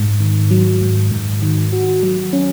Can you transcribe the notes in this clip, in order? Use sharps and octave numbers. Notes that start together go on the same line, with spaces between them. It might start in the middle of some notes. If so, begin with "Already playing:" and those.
Already playing: G#2
D#3
F#3
G#2
G#2
D#3
F#4
F#3
C#4